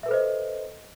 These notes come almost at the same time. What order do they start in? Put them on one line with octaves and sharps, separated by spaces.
E5 B4 A4 C5 D#5